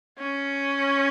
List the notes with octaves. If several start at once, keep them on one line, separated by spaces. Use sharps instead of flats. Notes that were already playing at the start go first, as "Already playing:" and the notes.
C#4